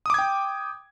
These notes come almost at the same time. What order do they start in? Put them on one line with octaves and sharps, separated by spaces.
D#6 D6 G#6 G5